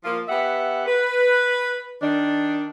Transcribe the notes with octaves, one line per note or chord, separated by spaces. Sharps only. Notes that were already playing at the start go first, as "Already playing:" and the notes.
F3 A#3 F4
B3 G4 E5 F#5
B4
D#3 D4